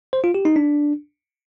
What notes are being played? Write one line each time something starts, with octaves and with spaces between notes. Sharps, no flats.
C5
F4
G4
D#4
D4